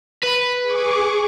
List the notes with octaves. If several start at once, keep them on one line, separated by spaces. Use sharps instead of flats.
B4
G#4 C#6 D6